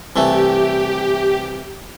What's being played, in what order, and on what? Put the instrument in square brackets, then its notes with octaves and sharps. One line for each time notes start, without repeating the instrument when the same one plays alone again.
[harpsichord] C2 E3 A3 [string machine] G4